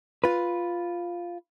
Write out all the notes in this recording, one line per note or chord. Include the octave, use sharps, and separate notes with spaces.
F4 B4